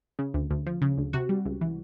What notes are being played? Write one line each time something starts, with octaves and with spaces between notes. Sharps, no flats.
C#3
D2
D2
F3
C#3
D2
C3 F#4
G3
C#2
E3